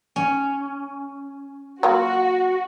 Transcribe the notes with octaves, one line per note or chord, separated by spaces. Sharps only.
C#4
F#3 A#3 F4 F#4